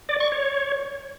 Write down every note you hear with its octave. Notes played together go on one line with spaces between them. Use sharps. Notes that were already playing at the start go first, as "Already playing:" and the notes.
D5
C#6
C#5